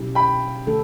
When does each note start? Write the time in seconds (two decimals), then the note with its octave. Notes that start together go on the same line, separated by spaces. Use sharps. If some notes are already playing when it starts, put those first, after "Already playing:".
Already playing: B2 F#3 C#4 E4 G4
0.15 G5 B5
0.67 D3 A3 D4 A4